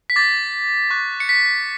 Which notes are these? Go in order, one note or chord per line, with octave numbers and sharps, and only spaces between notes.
B6
D6 G6 A6
C#6 F#6
C#7
B6